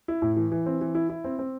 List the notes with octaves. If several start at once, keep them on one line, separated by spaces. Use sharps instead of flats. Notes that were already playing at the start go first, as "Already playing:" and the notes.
E4
A2
E3
E3
C4
E3
E4
E4
C4
C4